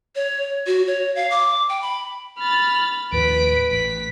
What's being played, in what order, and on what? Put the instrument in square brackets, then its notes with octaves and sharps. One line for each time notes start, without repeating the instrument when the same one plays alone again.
[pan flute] C#5
F#4
C#5
F5
D6
G5
B5
[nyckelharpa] B5 [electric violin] F6 A6
[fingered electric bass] D#2 A2 F3 [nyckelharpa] B4 [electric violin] B6 D7
[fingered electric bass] A1 [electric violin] B6